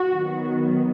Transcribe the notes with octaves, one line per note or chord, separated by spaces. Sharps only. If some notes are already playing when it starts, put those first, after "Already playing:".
Already playing: F#4
D#3 F#3 B3